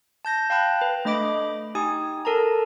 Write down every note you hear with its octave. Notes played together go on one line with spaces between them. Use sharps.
A5 G6 A#6
F5 G5 A5 B5 F#6
B4
A3 D4 D#5 B5 D6 D7
D#4 G4 G#5 D#6
A4 A#4 A5 A#5